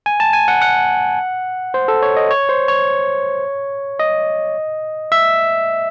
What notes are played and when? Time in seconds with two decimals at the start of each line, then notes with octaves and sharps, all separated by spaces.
0.06 G#5
0.20 A5
0.33 G#5
0.48 F#5
0.62 F#5
1.74 C5
1.88 A4
2.02 C#5
2.16 D#5
2.31 C#5
2.49 C5
2.68 C#5
3.99 D#5
5.12 E5